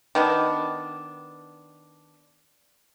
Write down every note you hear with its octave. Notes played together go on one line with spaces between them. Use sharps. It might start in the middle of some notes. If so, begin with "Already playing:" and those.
D#3 B3 D4